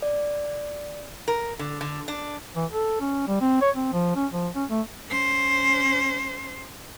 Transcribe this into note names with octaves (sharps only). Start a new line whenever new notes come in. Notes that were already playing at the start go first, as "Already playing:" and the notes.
D5
A#4
D3
D3
D4
E3
A4
C#4
G3
C4
C#5
C4
F3
C#4
F3
C#4
A3
C#4 C5